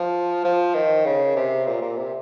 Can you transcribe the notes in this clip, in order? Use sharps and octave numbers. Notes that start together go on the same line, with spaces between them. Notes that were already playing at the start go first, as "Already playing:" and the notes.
Already playing: F3
F3
D#3
C#3
C3
A#2
A#2
C3